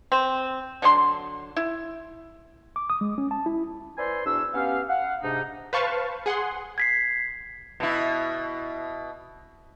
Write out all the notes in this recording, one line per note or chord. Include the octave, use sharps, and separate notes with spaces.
C4
D3 F#3 D4 C6
E4
D6
D#6
G#3
C#4
A5
E4
B4 C5 D5 E5 G#5 C6
E2 D4 F#4 E6
B3 C#4 G4 F5
F5 F#5
G#2 C3 D4 D#4
B4 C5 F5 A5 C#6
G#4 F#5 C6
G#6 B6 C7
B2 E4